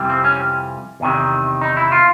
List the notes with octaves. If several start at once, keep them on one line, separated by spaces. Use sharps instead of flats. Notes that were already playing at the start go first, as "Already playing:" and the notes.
Already playing: F2 C3 E3 G3
C4
C#4
E2 C3 D#3
D#4
E4
F4